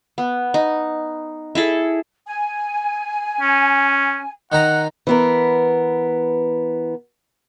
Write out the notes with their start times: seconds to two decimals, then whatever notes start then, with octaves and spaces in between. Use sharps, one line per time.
0.18 B3
0.54 D#4
1.55 E4 G#4 A4
2.26 G#5
3.41 C#4
4.52 D#3 D#4 F#5 A#5
5.07 E3 B3 A#4